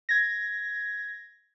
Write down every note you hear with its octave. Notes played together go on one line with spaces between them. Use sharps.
G#6 A#6